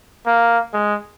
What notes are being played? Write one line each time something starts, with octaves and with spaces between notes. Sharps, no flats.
A#3
G#3